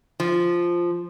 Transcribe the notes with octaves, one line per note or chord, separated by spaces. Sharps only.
F3